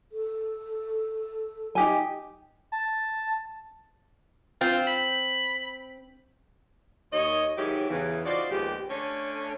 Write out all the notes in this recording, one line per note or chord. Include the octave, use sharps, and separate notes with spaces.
A4
D#4 G4 G#5
A5
C4 F4
B5
D#2 C#5 D#5
G#2 D#3 F#3 E4 G4 C#5
E2 C#3 E3
D#4 F4 F#4 C5 D5
D#2 G#2 F3 B3 G4
D3 A3 C#4 C#5